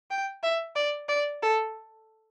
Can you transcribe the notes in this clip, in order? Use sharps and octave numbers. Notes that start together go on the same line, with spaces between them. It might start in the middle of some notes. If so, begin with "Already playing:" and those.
G5
E5
D5
D5
A4